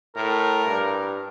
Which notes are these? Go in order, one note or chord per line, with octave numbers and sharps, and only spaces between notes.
A2 A#4
G2